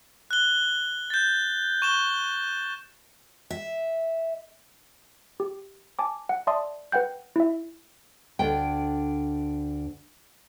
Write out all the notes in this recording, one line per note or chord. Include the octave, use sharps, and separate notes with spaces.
F#6 G7
G6 A6
C#6 E7 G7
E5
G4
G#5 A5 D6
F#5
D5 E5 A5 C6 D#6
B4 F#5 G5 G6
E4 E5
D2 D4 G5